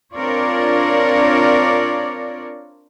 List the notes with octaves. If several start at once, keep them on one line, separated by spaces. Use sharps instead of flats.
C4 D4 F4 A#4 C#5 D5